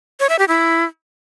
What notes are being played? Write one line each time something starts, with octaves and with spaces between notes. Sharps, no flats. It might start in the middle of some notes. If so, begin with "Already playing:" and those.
C#5
E5
G4
E4